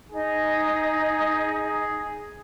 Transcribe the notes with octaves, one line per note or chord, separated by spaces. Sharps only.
D#4 G#4